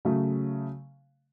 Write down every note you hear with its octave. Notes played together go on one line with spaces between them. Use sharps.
C#3 F#3 A3